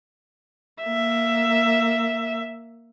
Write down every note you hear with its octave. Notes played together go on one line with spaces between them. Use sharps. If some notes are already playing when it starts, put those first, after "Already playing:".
A#3 E5